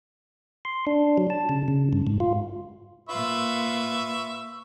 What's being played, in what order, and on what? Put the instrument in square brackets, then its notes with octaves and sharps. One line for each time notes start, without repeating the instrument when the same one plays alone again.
[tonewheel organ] C6
D4
F#3
A5
C#3
C#3
G2
G#2
F4
[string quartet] A#2 F4 [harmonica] B4 E5 C#6